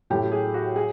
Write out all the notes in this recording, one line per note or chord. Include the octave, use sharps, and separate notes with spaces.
A1 A2 F#3 A3 G4
G#4
F#4
G#4